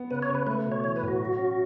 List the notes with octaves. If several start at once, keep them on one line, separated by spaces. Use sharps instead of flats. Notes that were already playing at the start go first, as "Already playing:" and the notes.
Already playing: B3
C#3 B4
C#5
C#3
B4
A3 B4
B2
C#5
E3 C#5
B4
A2
F#4
F#3
C#4